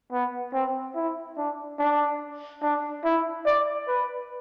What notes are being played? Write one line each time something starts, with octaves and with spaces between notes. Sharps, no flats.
B3
C4
E4
D4
D4
D4
E4
D5
B4